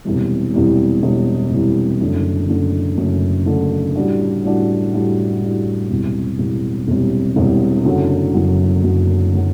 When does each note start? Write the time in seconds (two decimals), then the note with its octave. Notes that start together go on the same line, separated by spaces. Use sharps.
0.05 E1 E2 C3 E3 G3
0.54 E1 E2 C3 E3 G3
1.02 E1 E2 C3 E3 G3
1.51 E1 E2 C3 E3 G3
2.00 F#1 F#2 D3 A3 D4
2.49 F#1 F#2 D3 A3 D4
2.97 F#1 F#2 D3 A3 D4
3.46 F#1 F#2 D3 A3 D4
3.95 A2 G3 D4 F#4
4.44 A2 G3 D4 F#4
4.93 A2 G3 D4 F#4
5.41 A2 G3 D4 F#4
5.90 E1 E2 C3 G3
6.39 E1 E2 C3 G3
6.88 E1 E2 C3 G3
7.36 E1 E2 C3 G3
7.85 F#1 F#2 D3 F#3
8.34 F#1 F#2 D3 F#3
8.83 F#1 F#2 D3 F#3
9.34 D3 F#3